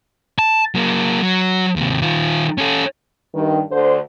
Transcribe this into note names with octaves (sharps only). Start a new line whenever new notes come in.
A5
F#3 A#3
F#3
D#2 C3
D#3 F4
C#4 A4
G2 D#3
D2 D3 C5